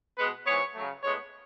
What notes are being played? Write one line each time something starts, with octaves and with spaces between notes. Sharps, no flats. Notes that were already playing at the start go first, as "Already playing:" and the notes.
B2 G#3 B3 B4
G#2 E3 B3 C#5
C#3 F#3 A3
A2 G#3 B3 C#5